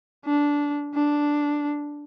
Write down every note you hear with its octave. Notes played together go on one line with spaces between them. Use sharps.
D4
D4